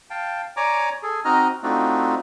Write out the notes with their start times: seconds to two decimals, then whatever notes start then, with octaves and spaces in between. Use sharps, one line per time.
0.10 F5 G5 A5
0.57 C#5 D5 G#5 A#5 D6
1.03 G#4 A4
1.25 C4 D#4 F#4 D#5 A#5 F6
1.63 A3 C4 D4 D#4 F4 F#4